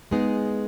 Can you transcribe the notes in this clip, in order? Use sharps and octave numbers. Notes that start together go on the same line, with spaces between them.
G#3 B3 D#4 G#4